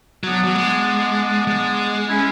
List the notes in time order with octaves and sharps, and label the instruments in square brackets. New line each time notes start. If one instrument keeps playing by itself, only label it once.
[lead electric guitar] F#3 [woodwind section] B3 D4
[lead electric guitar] F#3
G#3
G#3
[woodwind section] C#4 E4